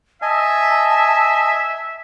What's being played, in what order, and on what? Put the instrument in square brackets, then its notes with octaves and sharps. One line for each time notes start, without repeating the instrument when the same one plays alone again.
[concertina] D#5 G#5 [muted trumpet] E5 [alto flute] A5